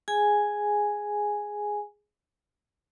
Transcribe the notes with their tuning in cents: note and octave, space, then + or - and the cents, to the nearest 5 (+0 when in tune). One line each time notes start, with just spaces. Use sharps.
G#4 +0 G#5 +0